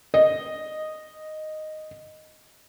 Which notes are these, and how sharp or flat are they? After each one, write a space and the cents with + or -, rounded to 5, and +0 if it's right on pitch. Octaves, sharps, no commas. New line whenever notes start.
D#5 -5